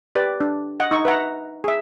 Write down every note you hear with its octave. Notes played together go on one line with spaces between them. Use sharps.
G4 B4 D5
D4
D#5 F#5
D#4 C#6
B4 E5 F#5 A#5
G#4 E5